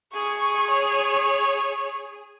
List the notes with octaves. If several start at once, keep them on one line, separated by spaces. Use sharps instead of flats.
G#4 C#6
C#5